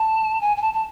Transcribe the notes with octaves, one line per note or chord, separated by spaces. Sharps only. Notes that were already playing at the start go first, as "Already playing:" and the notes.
Already playing: A5
G#5
G#5
A5
A5